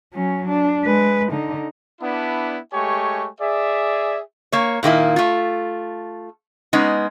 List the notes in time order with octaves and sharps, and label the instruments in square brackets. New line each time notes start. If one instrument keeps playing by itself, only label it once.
[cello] F#3 C#4
D4
G#3 B4
D3 D#4
[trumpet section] B3 D4 E4
G#3 A3 G4 C#5 G#5 C#6
G#4 D5 E5
[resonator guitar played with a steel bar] A#3 C#5
A#2 D#3 A#3 E4
A3 F4
G#3 B3 C#4 D#4